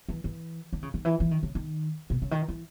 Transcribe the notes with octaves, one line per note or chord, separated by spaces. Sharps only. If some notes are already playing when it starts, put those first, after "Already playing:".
E3
E3
D#3
C#3
D#3
E3
E3
D#3
C#3
D#3
B2
C#3
D#3
E3